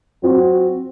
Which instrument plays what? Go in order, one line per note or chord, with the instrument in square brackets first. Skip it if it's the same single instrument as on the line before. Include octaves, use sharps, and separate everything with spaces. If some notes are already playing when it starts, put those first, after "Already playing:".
[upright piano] F#3 C4 F#4